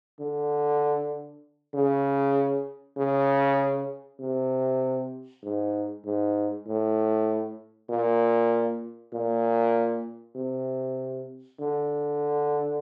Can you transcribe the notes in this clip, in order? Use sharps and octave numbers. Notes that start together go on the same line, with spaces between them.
D3
C#3
C#3
C3
G#2
G#2
A2
A#2
A#2
C3
D3